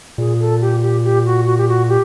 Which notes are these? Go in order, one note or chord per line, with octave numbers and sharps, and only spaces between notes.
A#2 G#4
A4
G4
G4
G4
F#4
F#4
G4
F#4
G4